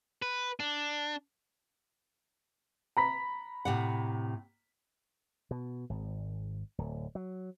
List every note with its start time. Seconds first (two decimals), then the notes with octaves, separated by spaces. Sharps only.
0.22 B4
0.60 D4
2.97 A#5 B5 B6
3.65 A2 C3 F#5
5.51 B2
5.90 G#1
6.78 D1
7.15 F#3